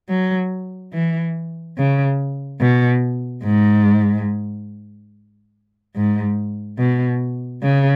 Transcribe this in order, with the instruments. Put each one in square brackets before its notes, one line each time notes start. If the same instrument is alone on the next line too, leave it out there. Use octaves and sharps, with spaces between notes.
[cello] F#3
E3
C#3
B2
G#2
G#2
B2
C#3